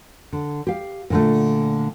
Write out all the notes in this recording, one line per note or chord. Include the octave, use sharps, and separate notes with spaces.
D3
G4 F5
A#2 D3 A3